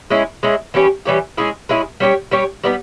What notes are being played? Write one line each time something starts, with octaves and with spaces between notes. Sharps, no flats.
G#3 C#4 E4
G#3 C#4 E4
E3 G3 C#4 G4
E3 G3 C#4 G4
G#3 C#4 E4 G#4
G#3 C#4 E4 G#4
G3 C#4 G4 C#5
G3 C#4 G4 C#5
G3 B3 D#4